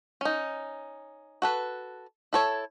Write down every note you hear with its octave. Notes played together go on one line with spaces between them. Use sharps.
C#4 D#4
F#4 A4 B4
E4 A4 C#5